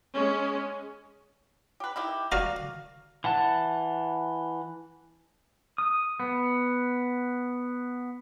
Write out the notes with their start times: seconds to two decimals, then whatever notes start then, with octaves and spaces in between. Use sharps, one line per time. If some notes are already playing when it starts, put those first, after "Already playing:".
0.14 G#3 C#4
1.80 G4 B4
1.96 D#3 E4 G4
2.32 F#4 D5 F5 A#5
3.24 E3 F#5 A5
5.78 D#6
6.20 B3